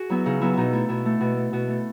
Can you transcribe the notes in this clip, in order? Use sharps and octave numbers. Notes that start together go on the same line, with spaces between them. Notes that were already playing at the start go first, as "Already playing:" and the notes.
Already playing: F#4 G#4
F#3 B3 E4
C#3 D#4
F#3 B3 E4
B2 D#4 E4
A3 E4
B2 E4
A3
B2
A3
B2
A3